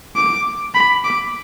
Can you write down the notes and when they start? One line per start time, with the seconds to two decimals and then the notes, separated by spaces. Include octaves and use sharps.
0.16 D6
0.74 B5
1.04 D6